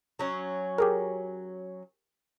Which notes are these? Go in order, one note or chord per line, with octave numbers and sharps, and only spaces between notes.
F#3 C#4
G4 G#4 A#4